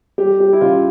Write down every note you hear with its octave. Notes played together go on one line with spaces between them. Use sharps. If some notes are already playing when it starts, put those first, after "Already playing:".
G3 G4
G3 G4
E4
C#3 F4